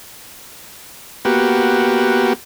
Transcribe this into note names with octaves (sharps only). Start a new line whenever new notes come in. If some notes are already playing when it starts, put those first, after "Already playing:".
A#3 B3 F#4 G4